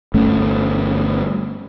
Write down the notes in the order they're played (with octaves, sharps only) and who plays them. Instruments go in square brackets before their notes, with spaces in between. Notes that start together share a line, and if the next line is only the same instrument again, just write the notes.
[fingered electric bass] G1 A3 C#4